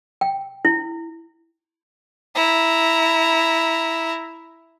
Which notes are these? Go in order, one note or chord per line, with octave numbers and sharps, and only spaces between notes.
G5
E4
E4 A#5